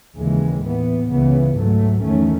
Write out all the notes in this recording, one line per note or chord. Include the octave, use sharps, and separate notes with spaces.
D#2 C#3 E3 G#3
A2 E3 B3
C#2 C#3 E3 B3
G#2 F#3 A3
E2 D#3 A3 C#4